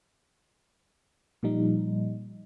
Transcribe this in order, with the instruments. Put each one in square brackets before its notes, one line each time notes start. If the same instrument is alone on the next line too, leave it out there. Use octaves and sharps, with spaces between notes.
[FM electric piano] A#2 F3 G3 D#4